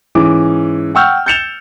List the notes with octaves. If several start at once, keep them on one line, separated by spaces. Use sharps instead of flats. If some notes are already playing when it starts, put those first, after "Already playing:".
G#2 E3 G#3 C#4 D6
F#5 G5 C#6 E6 F6 G6
G6 A6 C#7 E7 F7 G7